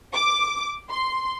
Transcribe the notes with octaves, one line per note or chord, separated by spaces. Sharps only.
D6
C6